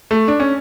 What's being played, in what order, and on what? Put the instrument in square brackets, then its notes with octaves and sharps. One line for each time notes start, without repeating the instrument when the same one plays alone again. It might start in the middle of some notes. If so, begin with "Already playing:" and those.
[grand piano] A3
D4
C#4